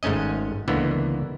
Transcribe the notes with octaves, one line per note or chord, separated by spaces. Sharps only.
G#1 G#2 A3 C#4 D#5
C#2 D3 E3 A#3 B3